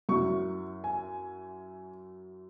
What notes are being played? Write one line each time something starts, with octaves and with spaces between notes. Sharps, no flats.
F#2 F#3 E4 C#6
G#5